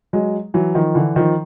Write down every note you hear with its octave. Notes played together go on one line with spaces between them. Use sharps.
F#3 G#3
E3 F#3
D#3 F3
D3 E3
D#3 F3